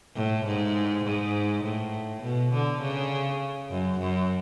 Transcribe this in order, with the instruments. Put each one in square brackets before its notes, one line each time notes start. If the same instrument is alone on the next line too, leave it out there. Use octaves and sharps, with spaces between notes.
[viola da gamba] A2
G#2
G#2
A2
B2
D3
C#3
F#2
F#2